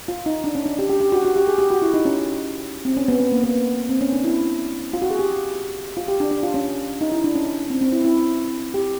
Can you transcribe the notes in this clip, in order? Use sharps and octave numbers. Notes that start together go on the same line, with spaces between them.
F4
D#4
D4
C#4
D4
G4
G4
G4
F#4
F#4
G4
G#4
G4
F#4
E4
D#4
C#4
C4
C#4
B3
B3
A#3
B3
C4
C#4
D4
E4
F4
F#4
G#4
G4
F4
G4
D4
D4
F4
C#4
D#4
E4
D4
C#4
C4
C4
E4
E4
G4